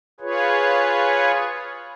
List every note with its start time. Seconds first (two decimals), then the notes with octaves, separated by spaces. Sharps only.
0.20 F4 G#4 B4 C#5